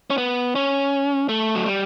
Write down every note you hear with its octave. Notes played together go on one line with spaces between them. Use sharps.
C#4
B3
C#4
A3
F#3
G3